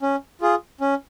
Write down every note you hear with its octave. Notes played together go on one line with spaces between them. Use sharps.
C#4
F4 G#4
C#4